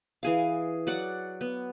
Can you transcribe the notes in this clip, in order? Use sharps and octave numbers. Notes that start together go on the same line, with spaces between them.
E3 G#4 F5
F#3 D5 F#5
B3